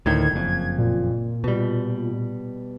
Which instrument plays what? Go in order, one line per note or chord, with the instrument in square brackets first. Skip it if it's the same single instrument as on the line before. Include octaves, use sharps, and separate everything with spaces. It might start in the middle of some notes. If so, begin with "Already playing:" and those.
[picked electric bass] D2 A2 D#3 [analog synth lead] G#6
[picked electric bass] F#1 F2
[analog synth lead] A#2
[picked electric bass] B2 G3